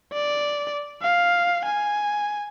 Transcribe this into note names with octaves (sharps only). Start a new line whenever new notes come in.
D5
F5
G#5